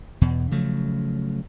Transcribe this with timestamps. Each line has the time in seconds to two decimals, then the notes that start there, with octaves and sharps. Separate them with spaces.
0.21 E2 B2
0.51 C#3 F3 F#3 A3